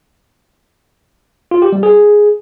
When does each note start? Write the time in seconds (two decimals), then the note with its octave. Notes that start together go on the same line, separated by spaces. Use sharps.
1.51 F4
1.62 G4
1.72 G3
1.83 G#4